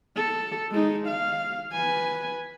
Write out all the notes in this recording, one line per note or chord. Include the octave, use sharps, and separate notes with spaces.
A4
G#3 D#4
F5
B4 G#5